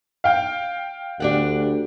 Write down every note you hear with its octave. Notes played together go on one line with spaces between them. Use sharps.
F5 G5
D2 D4 G4 F#5